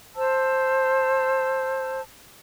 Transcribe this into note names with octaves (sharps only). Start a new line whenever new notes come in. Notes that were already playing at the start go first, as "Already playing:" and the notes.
C5 A5 E6